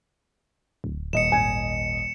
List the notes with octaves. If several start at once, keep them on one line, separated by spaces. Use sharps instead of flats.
D1
D#1 D#5 C#7 E7
G#1 G#5